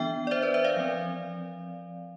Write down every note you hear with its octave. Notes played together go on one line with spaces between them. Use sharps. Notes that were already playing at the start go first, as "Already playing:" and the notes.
Already playing: E3 B3 D4 E5 G5
D5
C5 E5
B4 D5
C5 E5
D5 F5
F3 C4